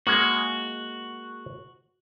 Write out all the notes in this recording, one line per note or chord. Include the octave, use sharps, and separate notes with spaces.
G#3 A#3 F#4